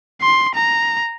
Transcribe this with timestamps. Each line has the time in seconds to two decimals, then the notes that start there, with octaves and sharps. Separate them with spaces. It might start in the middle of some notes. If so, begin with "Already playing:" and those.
0.21 C6
0.54 A#5